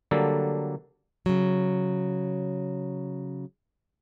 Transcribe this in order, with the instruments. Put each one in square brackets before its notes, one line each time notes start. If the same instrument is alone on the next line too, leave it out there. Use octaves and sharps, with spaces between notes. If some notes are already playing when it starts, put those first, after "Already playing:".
[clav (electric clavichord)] D3 F#3 G3 A#3 A4
[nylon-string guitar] C#3 F#3